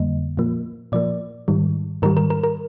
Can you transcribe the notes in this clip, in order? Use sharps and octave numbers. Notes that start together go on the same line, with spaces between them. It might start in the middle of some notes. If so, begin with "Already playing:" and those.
Already playing: F2 D3 G3 A#3 D#5
A#2 F3 A#3
A#2 F3 A#3 D5
G#2 D#3 G3
G#2 D#3 G3 A#4
A#4
A#4
A#4